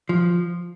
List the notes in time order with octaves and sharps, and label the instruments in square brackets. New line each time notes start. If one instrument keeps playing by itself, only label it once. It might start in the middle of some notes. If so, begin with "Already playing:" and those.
[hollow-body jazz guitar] F3